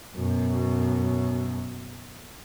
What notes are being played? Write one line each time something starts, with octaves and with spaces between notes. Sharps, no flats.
F#2 B2